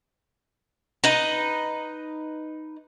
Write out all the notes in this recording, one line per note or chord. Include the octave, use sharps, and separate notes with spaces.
D#4 B4 D#5